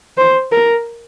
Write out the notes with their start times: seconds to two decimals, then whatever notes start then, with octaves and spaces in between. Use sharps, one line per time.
0.18 C5
0.52 A#4